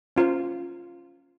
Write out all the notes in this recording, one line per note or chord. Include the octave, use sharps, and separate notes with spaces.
C#4 F4 C5 F5